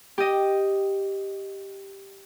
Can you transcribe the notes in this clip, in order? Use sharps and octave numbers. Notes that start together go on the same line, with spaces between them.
G4 D#5